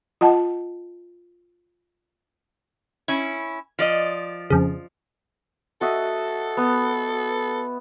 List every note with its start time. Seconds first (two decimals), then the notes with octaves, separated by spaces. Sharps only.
0.21 F4 D#5 F#5 A5
3.08 C#4 E4 G#6
3.79 F3 D5 D#5
4.50 F2 C#3
5.81 F#4 A4 D#5 E5
6.57 B3